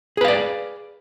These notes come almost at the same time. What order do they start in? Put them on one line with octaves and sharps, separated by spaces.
G#4 B4 F5 D5